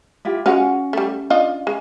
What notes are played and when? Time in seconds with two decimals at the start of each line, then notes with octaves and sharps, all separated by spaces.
0.25 E4 F4 G4
0.46 G#3 C#4 F4 F#4 F#5
0.93 G3 A3
1.30 D4 F4 D#5
1.67 G#3